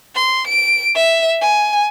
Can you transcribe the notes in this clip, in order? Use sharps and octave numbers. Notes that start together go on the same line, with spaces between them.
C6
D7
E5
G#5